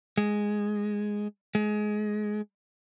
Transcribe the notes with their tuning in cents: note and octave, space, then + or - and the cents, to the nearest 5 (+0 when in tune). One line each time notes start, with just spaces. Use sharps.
G#3 +0
G#3 +20